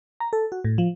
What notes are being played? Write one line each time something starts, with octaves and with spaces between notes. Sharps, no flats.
A#5
A4
F#4
A2
F3